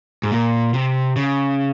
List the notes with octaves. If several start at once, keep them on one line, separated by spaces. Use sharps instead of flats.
G#2
A#2
C3
C#3